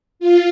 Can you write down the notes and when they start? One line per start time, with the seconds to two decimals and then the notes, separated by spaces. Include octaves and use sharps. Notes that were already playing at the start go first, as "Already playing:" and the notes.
0.20 F4